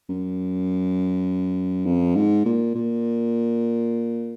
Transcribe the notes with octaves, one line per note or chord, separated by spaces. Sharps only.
F#2
F2
G#2
A#2
A#2